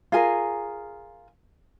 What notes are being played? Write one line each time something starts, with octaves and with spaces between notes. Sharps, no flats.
F4 G#4 A#4 G#5